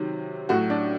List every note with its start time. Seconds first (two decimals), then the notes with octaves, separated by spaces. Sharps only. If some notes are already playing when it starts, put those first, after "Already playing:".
Already playing: C3 D#3 F#3
0.49 A2 F#3 F#4
0.70 D4